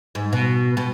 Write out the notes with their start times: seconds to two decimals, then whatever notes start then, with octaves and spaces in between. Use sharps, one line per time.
0.15 G#2
0.33 B2
0.77 B2